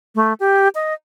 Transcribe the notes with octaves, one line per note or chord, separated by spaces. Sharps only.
A3
G4
D#5